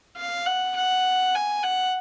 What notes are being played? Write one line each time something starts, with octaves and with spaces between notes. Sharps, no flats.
F5
F#5
F#5
G#5
F#5